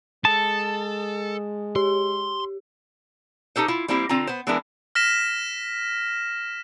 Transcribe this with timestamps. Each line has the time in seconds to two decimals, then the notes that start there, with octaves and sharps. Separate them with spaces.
0.25 G#3 A4 A5 D#6
1.76 G4 C6
3.56 D#4 G4 A4 C5
3.68 E4 F4
3.88 G3 A#3 C4 E4 G4
4.09 D3 C4 F4 A#5
4.27 B3 C5
4.47 E3 G#3 B3 D4 E4 A#4
4.95 F6 A#6 B6 E7